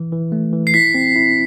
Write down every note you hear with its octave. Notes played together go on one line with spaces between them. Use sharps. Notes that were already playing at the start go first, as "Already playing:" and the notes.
Already playing: E3
E3
A3
E3
C7
E4 B6
C4
E4